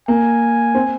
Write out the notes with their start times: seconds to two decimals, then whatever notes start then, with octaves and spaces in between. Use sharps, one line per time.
0.08 A#3 G#5
0.75 C4